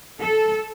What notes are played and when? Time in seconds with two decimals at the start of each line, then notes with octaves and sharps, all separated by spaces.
0.21 A4